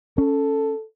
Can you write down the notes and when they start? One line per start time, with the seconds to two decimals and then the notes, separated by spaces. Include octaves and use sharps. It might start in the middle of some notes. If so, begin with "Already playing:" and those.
0.18 C#4 A4